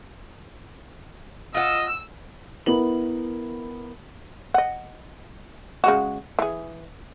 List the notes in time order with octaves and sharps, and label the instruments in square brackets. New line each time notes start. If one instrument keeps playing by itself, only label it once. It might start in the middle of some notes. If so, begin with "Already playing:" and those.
[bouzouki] F4 F#5 [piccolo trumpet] D#5 [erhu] E6
[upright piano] B3 E4 A#4 F#7
[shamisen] D#5 F#5
C#3 G#3 F#4
E3 G#4